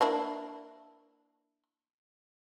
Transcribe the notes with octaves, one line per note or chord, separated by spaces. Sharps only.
A#3 D4 E4